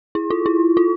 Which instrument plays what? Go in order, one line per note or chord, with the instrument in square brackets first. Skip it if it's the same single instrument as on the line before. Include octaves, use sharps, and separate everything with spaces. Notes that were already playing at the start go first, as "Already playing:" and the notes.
[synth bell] E4
F4
E4
F4